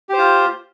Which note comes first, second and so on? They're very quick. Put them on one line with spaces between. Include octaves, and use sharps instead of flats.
G4 C5 F4